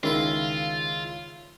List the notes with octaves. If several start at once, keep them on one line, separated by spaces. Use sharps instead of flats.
C#2 D#3 E4 F4 C6